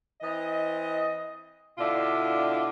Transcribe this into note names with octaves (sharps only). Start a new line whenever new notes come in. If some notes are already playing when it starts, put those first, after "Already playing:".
E3 C4 D#5
B2 D3 D4 E4 F4